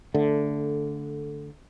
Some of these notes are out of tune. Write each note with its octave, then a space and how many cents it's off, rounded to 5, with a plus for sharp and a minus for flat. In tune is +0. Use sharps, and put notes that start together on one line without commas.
D3 -10 A3 +0